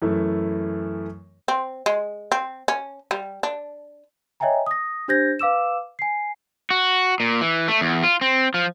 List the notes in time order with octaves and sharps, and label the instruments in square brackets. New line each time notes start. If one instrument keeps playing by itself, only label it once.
[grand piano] F#2 E3 A3 E4
[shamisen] C4
G#3
C4
C#4
G3
D4
[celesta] C#5 D#5 E5 G5 G#5 A#5
D#6 A#6
D4 G4 C5 G6 G#6 A#6
B4 F5 D6 E6 E7
G#5 C7
[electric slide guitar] F#4
A#2
E3
A3
E2
F4
C4
F3